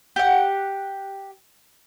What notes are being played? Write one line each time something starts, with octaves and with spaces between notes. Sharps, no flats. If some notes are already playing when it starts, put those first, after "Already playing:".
G4 F#5